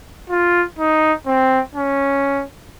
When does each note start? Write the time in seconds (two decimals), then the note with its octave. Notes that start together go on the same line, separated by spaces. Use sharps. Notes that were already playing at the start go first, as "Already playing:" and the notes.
0.30 F4
0.79 D#4
1.26 C4
1.76 C#4